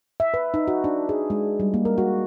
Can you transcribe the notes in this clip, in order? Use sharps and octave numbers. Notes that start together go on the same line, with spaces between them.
E5
B4
D#4
F#4
D4
G#4
G#3
G3
A#3
A#4
F#4